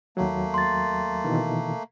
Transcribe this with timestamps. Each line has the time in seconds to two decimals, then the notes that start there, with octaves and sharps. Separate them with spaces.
0.17 D#2 F#3 A3 A#3
0.54 C6 A6
1.25 B2 D#3 E3